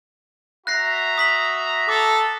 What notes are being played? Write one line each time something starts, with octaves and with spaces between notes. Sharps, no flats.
F#4 E5 A#5 F#6 A#6 C7
D#6 B6 F#7
A4 D6